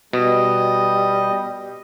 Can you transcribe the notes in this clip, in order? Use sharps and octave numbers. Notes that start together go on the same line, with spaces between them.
B2 G3 D#5